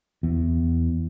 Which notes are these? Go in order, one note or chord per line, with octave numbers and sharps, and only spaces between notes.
E2